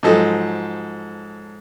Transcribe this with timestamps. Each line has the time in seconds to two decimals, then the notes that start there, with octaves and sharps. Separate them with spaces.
0.03 G#2 F3 F#3 A4 D#5